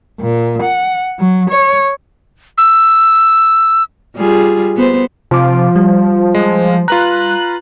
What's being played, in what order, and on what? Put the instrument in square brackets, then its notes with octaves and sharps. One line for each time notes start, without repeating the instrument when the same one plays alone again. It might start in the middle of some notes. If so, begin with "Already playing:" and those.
[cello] A#2
F#5
F#3
C#5
[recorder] E6
[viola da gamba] G3 F4 G#4
B3 C5
[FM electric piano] C3 D6 [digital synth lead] F3
[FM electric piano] G3
[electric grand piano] G#3
[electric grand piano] F4 B4 A#5 [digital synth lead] F#6